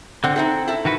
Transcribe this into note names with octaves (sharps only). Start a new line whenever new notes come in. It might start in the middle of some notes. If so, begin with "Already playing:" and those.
D3 C4 F#5
C4 D#4 E4 A4
E4 A4
D#3 F#4 B4